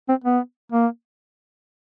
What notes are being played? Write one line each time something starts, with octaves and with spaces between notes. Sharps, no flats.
C4
B3
A#3